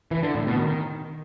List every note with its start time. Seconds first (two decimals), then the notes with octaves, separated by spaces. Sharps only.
0.11 E3
0.23 D3
0.35 A2
0.47 B2
0.59 D#3